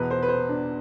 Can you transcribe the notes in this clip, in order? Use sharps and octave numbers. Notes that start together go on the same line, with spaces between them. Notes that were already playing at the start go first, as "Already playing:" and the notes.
Already playing: E2 B2 B4
C5
B4
C5
D4